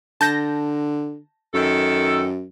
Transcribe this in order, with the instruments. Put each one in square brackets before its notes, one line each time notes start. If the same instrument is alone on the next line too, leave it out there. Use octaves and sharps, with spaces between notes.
[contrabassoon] D3 [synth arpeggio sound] A5 G6 A#6
[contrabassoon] F#2 [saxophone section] D#3 A4